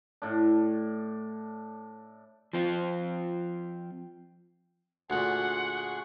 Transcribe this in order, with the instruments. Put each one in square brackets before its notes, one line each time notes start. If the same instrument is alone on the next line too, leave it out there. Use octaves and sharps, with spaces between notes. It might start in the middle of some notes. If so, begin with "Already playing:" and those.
[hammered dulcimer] A2 D4
[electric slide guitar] F3 C4 F4
[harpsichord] D2 A#2 [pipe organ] G#4 C6 C#6 [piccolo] F#5